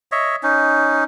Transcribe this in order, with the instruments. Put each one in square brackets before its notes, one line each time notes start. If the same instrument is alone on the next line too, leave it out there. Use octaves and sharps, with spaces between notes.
[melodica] C#5 D#5 E5
C#4 D#4